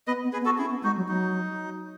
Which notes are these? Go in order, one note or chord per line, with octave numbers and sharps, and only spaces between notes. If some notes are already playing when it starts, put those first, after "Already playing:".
B3 B4 D#5
B3
G#4 B4
B3
F#4 A4
C#4 E4 G#4
B3
G#3 D#4 F#4
F#3
F#3 D#4